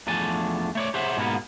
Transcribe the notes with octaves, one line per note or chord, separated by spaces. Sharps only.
E2 F3 A3 D4 G#5 A5
A3 C#5 D5
G4 G#4 C5 C#5 E5 F#5
G#2 B2 A#3 B3